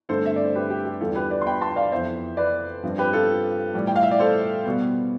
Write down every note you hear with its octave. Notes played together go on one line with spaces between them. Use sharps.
G2 D3 A3 C4 A4 C5
E5
D5
C5
G4 B4
G4
G4
E2 D3 G3 B3 F4 A4
G4 B4
B4 D5
C6
G5 B5
A5 C6
D5 F5
F2 E3 B3 C5 E5
B4 D5
G2 F3 C4
G4 B4
F4 A4
A2 E3 G3
G5
F5
E5
D5
A4 C5
B2 G3 B3